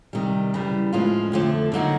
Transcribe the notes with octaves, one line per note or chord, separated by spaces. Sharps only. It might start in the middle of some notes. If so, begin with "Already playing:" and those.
C3 D#3 G3
F#2 C#3 E3 G3
A2 F3 G#3 C#4 F4
F2 D3 F3 A3
D3 F#3 A#3 D#4 F#4